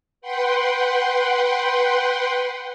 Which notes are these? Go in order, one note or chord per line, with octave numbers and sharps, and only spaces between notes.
B4 F#5 G5 C6